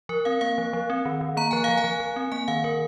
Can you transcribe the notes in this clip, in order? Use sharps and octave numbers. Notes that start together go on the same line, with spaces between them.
F3 A#4
C4 F5
A#3 F5
F3
F3
C4
D#3
D#3
A#3 A#5
F3 G#5
F3 F5
G#5
F3
F3
C4
A#3 G#5
D#3 F5
D#3 A#4